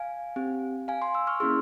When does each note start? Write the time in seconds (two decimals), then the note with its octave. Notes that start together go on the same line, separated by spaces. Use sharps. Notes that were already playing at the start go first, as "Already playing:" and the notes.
Already playing: F5 G#5
0.36 C4 G4
0.88 F5 G#5
1.02 G#5 C6
1.14 C6 E6
1.27 C#6 F6
1.40 A#3 C#4 E4 G#4 C6 E6